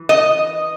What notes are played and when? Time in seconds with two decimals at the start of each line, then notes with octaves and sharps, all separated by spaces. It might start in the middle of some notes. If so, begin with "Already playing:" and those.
Already playing: E3
0.09 D#5